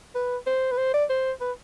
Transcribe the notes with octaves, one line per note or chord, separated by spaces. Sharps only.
B4
C5
B4
C5
D5
C5
B4